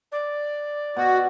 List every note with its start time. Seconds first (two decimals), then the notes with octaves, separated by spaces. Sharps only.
0.12 D5
0.97 B2 F#4